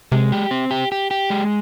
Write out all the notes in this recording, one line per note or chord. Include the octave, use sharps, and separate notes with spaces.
C3 G#3
G4
C4
G4
G4
G4
G#3